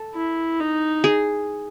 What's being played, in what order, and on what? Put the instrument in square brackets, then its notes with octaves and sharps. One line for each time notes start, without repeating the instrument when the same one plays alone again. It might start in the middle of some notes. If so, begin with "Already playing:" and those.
Already playing: [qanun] A4
[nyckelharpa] E4
D#4
[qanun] G#4